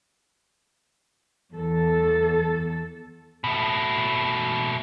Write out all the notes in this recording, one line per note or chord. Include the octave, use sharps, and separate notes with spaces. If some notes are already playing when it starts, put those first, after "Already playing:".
E2 A4
B2 A3